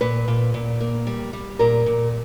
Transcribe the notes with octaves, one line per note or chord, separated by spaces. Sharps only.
A#2 B4
A#2
A#2
A#3
G3
G3
A#2 A#4
A#2